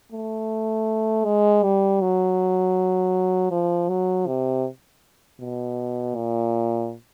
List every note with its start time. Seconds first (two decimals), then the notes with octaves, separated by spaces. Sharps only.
0.12 A3
1.24 G#3
1.63 G3
2.01 F#3
3.51 F3
3.89 F#3
4.27 C3
5.40 B2
6.15 A#2